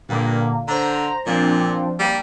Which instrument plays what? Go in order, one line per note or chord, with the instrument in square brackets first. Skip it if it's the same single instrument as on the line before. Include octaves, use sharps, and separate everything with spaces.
[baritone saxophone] G2 [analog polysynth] A#2 D3 A#3
[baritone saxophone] D3 [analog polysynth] C5 A#5
[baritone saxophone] A#2 [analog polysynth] F3 C4 D4
[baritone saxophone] G3 [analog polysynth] A#3